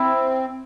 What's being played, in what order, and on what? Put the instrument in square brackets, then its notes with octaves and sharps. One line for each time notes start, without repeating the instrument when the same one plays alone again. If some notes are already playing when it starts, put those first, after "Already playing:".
Already playing: [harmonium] C4 [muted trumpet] E4